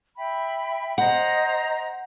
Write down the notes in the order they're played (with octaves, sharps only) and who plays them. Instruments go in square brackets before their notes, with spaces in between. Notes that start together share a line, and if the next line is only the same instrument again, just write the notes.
[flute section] E5 G5 B5
[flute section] C5 D#5 A#5 [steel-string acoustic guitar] F#5